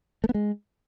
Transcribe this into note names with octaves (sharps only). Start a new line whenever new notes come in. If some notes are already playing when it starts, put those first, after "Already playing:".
A3
B3
G#3